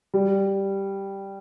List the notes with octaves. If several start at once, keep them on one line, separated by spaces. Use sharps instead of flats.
G3